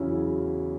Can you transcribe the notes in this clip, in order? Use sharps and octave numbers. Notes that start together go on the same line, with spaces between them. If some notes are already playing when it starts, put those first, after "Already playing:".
Already playing: E2 C#3 F#3 C#4 E4